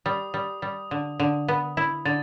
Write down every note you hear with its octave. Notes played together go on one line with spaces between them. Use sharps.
G3 D#6
G3
G3
D3
D3
B3
E4
D3 A6